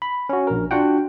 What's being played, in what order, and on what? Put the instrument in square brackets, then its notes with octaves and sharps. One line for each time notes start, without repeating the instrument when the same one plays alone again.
[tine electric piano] B5
C#4 F#4
A#1 A#4
D4 F4 F#4 F#5 G5